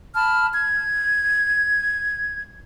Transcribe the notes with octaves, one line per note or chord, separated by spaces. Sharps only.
A5 B5 F6
G#6